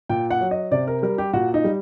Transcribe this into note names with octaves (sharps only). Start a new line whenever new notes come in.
A#2 G5
F#5
F#3
D#5
C3 D5
A#4
G3 A#4
G4
A#2 F#4
D#4
G3